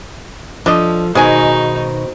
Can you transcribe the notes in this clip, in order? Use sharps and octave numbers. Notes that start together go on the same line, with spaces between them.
F3 D4 A4 D#5
B2 D#3 G#3 D#4 F#4 C5 G#5